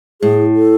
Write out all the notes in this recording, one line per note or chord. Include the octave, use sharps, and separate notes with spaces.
A2 G#4
A4